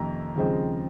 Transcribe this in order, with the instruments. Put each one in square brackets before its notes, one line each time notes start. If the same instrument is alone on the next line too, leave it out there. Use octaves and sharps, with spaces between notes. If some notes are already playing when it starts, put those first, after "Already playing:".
Already playing: [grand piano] F2 C3 D#3 A#3 C#4 A#5
D#2 C#3 F3 G#3 C4